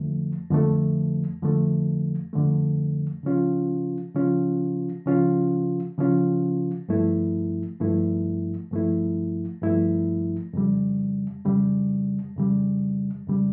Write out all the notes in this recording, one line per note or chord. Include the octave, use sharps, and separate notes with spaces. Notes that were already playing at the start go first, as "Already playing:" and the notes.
Already playing: F2 D3 F3 A3
F2 D3 F3 A3
F2 D3 F3 A3
F2 D3 F3 A3
C#3 F3 C#4 F4
C#3 F3 C#4 F4
C#3 F3 C#4 F4
C#3 F3 C#4 F4
G2 F3 A3 E4
G2 F3 A3 E4
G2 F3 A3 E4
G2 F3 A3 E4
F2 C#3 G3
F2 C#3 G3
F2 C#3 G3
F2 C#3 G3